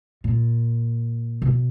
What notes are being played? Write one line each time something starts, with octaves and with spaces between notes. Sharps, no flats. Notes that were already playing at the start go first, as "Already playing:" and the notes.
A#2
B2